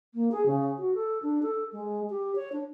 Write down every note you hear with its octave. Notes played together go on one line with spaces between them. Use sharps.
A#3
G#4
C#3
F#4
A4
D4
A4
G#3
G4
C#5
D4